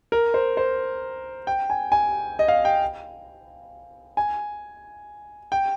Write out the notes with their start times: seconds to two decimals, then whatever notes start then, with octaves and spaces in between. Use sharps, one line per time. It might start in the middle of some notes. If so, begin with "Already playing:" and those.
0.12 A#4
0.34 C5
0.57 C5
1.47 G5
1.70 G#5
1.92 G#5
2.39 D#5
2.48 F5
2.65 G5
4.17 G#5
5.52 G5